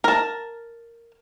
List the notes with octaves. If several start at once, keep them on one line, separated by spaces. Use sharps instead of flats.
A#4 A5